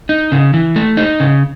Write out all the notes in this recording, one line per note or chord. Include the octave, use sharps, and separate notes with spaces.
D#4
C#3
E3
A3
D#4
C#3